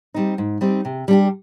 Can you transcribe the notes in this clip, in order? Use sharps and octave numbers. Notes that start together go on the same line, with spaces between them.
G3 C4 D#4
G#2
G3 C4 D#4
C3
G3 D4 G4